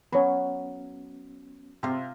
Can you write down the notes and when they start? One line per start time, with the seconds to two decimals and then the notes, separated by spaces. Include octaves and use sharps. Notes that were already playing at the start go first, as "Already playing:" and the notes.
0.13 F#3 B3 C#4 C#5 B5
1.83 C3 F4 F5